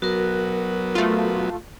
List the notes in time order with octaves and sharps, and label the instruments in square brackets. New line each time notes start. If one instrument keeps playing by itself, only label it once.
[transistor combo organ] F#3 B3 [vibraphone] F#4 A#4
[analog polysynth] A3 F4